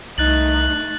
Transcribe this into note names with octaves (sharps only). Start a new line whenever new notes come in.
C2 A3 D#4 F#6 A6 F#7